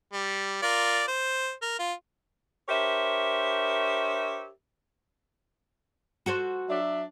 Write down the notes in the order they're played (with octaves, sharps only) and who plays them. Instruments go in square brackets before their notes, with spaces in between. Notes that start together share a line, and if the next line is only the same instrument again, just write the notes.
[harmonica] G3
F4 A#4 D5
C5
A#4
F4
[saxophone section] D4 G4 A#4 C5 C#5 E5
[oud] F#4 A4 C5
[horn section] F#3 D4 E5